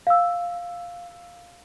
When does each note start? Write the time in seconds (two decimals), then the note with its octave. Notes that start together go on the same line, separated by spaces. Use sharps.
0.07 F5 E6